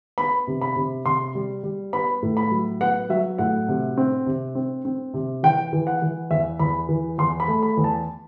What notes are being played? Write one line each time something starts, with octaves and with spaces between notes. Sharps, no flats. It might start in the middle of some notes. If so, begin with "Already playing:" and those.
B3 B5
C3
B5
C3
C3 C6
G3
G3
B3 B5
A2
B5
F#3
B3 F#5
F#3 E5
A2 F#5
C3
C4
C3
C4
C4
C3
E3 G5
E3
F#5
E3
E2 E5
E2 B5
E3
E2 C6
B5
A3
B5
E2
A5